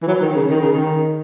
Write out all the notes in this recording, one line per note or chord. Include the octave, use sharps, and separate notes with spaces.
E3
F#3
D#3
C#3
D#3
C#3
D#3